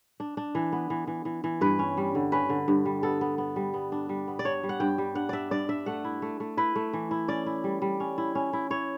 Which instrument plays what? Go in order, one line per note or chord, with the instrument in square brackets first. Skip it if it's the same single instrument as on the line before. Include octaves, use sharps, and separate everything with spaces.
[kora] D4
D4
E3
B3
E3
E3
E3
E3
G2 B4
C#4
G3
D3
C#4 B4
D3
G2
G3
B3 A4
B3
B3
G3
B3
D4
G3
B3
D5
D4 C#5
G3
F#5
G2 G5
G3
D4 F#5
D4 D5 E5
G2 D5
D4 E5
A3 F#5
E4
A3
A3
E4 B4
A3
E3
E4
C#4 D5
E4
G3
G3
C#4
E4
C#4
E4
E4 C#5